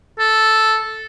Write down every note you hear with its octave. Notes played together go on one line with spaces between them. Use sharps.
A4